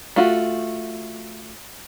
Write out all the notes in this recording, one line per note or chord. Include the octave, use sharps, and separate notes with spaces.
A3 F4 F#4